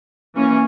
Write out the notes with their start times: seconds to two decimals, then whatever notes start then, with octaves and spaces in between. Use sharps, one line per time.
0.35 E3 A#3 C#4